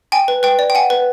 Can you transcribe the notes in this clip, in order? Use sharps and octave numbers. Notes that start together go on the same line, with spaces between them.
G5 G#5
B4
B4 G5
D5
G5
F#5 G#5
B4